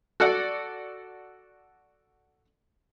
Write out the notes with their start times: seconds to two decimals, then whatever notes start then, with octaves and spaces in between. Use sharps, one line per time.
0.20 F#4 A4 D5 F#5